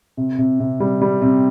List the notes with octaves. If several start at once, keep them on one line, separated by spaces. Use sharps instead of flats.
C3
C3
C3
G3
G3
C3